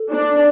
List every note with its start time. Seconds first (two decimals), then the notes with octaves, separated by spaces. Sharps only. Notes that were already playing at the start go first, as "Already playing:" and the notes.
Already playing: A4
0.11 D4